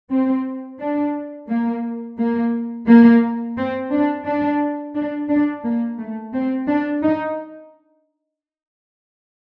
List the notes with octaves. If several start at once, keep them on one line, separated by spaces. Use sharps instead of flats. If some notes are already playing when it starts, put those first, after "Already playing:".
C4
D4
A#3
A#3
A#3
C4
D4
D4
D4
D4
A#3
A3
C4
D4
D#4